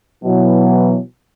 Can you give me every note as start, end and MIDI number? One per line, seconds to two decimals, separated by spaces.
0.24 0.98 47
0.24 0.98 52
0.24 0.98 54